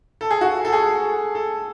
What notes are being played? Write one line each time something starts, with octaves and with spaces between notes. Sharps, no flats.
A4
G#4
F#4
A4
G#4
A4